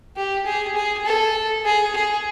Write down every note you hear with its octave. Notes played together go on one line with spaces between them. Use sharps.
G4
G#4
G#4
A4
G#4
G#4